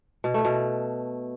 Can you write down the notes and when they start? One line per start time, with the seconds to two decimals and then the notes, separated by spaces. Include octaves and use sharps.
0.24 B2
0.34 A3
0.45 B2